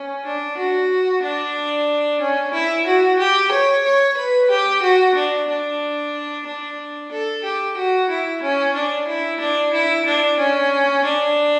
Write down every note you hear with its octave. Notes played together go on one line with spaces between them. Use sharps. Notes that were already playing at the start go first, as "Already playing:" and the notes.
Already playing: C#4
D4
F#4
D4
C#4
E4
F#4
G4
C#5
C#5
B4
G4
F#4
D4
D4
D4
A4
G4
F#4
E4
C#4
D4
E4
D4
E4
D4
C#4
D4